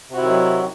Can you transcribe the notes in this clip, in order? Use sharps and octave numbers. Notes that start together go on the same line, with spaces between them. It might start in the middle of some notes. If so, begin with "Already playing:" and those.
C3 D#3 F#3 E4 F#4